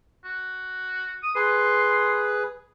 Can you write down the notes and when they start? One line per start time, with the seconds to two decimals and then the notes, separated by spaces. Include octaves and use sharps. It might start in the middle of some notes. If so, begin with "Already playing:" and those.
0.24 F#4
1.23 D#6
1.35 G#4 B4 C6